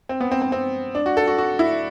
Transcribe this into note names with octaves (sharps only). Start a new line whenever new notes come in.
C4
B3
C4
C4
C4
D4
F#4
A4
F#4
F#4
E4